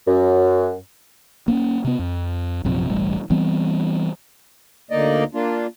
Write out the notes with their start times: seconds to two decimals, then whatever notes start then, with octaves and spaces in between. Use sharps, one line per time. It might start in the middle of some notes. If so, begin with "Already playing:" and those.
0.07 F#2
1.48 A#3 B3 C#4
1.85 C3 B3
1.99 F2
2.65 A#1 F#2 C3 F3
2.90 E1 A1 G3
3.30 E3 G3 B3 C4
4.91 D2 A#3 D#4 D5 D#5
5.34 A#3 D4 F4